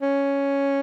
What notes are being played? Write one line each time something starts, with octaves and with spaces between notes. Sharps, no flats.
C#4